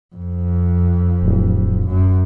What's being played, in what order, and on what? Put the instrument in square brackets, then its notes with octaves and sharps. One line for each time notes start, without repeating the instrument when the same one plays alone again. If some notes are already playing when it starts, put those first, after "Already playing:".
[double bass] F2
[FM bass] D1
[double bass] F#2